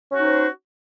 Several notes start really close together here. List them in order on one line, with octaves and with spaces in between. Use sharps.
C#4 F#4 D#4 C5